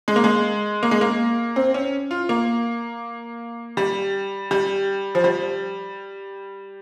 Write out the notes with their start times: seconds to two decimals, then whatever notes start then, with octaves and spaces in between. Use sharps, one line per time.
0.08 G#3
0.16 A#3
0.24 G#3
0.83 A#3
0.91 G#3
1.01 A#3
1.56 C4
1.74 C#4
2.11 F4
2.29 A#3
3.77 G3
4.51 G3
5.15 F3
5.24 G3